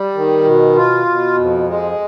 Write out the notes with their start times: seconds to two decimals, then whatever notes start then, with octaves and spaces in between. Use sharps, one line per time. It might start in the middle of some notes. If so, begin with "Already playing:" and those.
Already playing: G3
0.14 D#3
0.44 B2
0.75 F4
1.06 B2
1.37 F2
1.67 G#3